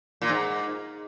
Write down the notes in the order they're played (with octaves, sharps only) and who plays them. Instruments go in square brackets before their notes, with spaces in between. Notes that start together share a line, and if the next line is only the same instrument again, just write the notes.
[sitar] A#2
G#2